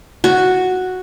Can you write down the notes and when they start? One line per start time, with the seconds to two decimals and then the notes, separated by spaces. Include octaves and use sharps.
0.24 F#4